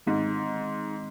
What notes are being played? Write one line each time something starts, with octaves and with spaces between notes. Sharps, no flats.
G#2 D#3 G#3 C4